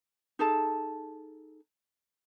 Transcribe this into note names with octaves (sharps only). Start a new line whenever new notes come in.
D#4 G#4 A4 A5